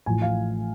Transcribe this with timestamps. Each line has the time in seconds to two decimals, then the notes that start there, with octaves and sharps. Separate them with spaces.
0.06 A1 A2 F3 G#5
0.22 F5